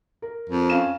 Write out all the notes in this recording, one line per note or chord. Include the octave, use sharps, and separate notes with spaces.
A#4
F2
C#4 F5 E7